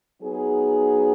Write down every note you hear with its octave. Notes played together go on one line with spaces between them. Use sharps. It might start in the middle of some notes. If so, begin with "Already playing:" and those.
F#3 B3 D#4 G#4